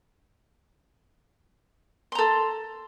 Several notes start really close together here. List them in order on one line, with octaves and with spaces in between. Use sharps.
C6 A#5 A4